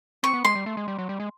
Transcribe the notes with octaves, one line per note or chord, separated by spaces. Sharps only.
C4 C#6
B3
G#3 C6
G3
A3
G#3
G3
F#3
G3
G#3